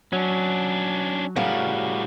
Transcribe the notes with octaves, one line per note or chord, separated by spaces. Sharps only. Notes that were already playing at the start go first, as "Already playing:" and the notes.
F#3 C#4 D4
A2 C#3 G3 F#4 A#4